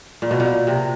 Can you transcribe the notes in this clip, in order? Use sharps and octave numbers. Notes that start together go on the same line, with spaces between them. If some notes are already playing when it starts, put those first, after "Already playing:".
A#2
B2
A#2
C3